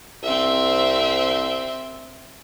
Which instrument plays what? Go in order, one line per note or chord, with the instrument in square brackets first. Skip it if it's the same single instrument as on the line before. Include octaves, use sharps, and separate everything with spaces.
[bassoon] C2 [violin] C4 E5